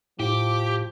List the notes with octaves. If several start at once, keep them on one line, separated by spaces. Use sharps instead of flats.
A2 F3 G4 D6